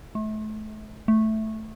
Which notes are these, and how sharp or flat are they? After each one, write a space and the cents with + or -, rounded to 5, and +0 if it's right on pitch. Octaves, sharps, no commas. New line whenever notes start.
A3 -35
A3 -5